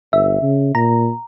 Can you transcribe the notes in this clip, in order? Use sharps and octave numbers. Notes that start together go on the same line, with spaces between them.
G1 E5
C#3
A#2 A#5